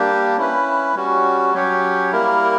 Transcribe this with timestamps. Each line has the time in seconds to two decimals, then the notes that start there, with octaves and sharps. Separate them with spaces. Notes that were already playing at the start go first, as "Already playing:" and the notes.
Already playing: G3 A#3 D4 G4
0.37 C#4 E4 B4
0.96 G3 C#4 F#4
1.54 F#3 C#4 G4 C#5
2.12 G3 A#3 E4 A#4